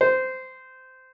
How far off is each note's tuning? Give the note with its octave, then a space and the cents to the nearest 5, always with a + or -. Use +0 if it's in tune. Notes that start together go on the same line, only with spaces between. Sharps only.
C5 -15